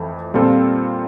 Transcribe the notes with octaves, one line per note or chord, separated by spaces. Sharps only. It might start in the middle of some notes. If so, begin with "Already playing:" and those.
Already playing: F2 E3 A3
A#2 G3 C4 F4 A4